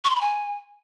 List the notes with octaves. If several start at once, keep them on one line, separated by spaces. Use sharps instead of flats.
C#6
C6
B5
G#5